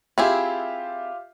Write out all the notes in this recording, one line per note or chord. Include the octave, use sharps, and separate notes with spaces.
C4 E4 F4 G4 G#4 E5